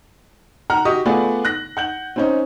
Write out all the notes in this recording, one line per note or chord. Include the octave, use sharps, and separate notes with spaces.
F#5 A#5 F6
F#4 G4 D#5 C#6 D#6
A3 B3 F4 G#4 D5 F#5
F#6 A#6
F#5 G6 F#7
C4 C#4 D#4